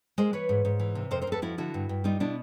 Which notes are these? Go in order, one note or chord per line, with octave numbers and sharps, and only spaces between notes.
G#3 A#4 C5
E3 B4 C#5
G#2
G#2
E3
C3
F2 A#4 C5
A#4 C5
F2 A4 B4
F3 E4 F#4
D3 E4 F#4
G2
G2
G3 D#4 F4
B2 D4 E4